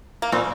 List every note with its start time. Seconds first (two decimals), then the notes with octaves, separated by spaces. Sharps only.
0.22 A#3
0.32 A#2 C4